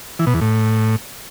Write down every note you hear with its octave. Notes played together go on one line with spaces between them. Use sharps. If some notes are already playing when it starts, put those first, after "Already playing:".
E3
B2
E2
A2